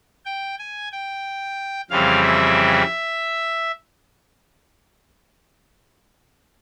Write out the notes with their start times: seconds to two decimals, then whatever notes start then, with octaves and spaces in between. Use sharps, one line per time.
0.25 G5
0.59 G#5
0.92 G5
1.90 F2 C#3 E3 G3 C4 F5
2.23 E5